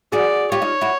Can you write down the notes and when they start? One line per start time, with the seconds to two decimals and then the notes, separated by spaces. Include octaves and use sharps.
0.12 F#4 G#4 D5
0.52 F4 G4 C#5
0.62 D#4 F4
0.81 E4 F#4